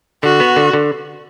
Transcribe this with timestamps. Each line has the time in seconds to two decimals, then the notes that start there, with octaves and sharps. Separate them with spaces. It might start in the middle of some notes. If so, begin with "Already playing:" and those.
0.23 D3 F#4
0.40 B3
0.56 D3
0.73 D3